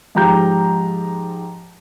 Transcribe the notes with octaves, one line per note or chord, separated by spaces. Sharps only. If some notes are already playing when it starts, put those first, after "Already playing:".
G#2 F3 G4 A#5 G6